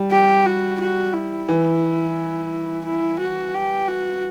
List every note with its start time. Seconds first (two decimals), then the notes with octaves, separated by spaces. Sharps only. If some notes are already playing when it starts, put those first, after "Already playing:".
Already playing: G3
0.11 G4
0.46 F#4
0.80 F#4
1.13 E4
1.48 E3
2.85 E4
3.19 F#4
3.54 G4
3.88 F#4